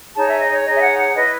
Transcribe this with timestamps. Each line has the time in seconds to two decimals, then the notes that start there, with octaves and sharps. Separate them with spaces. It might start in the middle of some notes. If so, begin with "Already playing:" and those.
0.15 D#4 G#4 C#5 A5
0.28 E5
0.40 D#5
0.53 C#5
0.66 D#4 G#4 C#5 D#5
0.76 E5
0.82 F#5
0.98 F#5
1.15 E4 B4 D#5